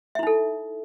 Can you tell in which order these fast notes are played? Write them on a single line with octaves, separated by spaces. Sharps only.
E5 E4 D#4 A4